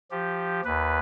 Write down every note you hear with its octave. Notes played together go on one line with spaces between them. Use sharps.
F3 G4
D#2 B4